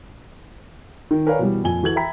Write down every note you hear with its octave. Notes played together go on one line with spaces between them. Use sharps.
D#3
A#4 B4 C#5 D5 F5 G#5
B2 E3 G3
F2 A#2 G#5 G7
E3 F#4 A4 G#6 F#7
E5 G5 A#5 B5 B6